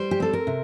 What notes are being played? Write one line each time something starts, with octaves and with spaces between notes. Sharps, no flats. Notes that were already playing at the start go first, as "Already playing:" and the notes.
Already playing: G3 C5
G4
C4 A4
A#4
C3